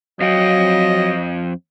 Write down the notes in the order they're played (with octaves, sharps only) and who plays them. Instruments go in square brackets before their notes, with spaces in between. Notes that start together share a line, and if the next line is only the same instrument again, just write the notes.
[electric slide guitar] F2 F5 G5 [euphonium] F#3 [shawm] D#5